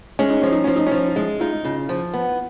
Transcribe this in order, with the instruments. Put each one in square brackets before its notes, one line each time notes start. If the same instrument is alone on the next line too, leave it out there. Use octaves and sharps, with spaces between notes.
[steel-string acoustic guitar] G#3 [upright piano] C#4
[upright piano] D#4
[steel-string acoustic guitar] F3 [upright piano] C#4
[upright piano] D#4
[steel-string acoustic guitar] F3 [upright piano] C#4
[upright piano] D#4
[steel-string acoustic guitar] F3 [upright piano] C#4
[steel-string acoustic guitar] G#3
[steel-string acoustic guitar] D#4 [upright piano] F4
[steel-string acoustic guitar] C#3
F3
B3